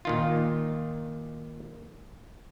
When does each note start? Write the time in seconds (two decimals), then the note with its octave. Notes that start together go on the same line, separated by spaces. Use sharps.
0.05 A#2 D#3 F4